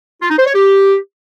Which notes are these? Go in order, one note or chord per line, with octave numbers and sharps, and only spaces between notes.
F4
D#4
C5
C#5
G4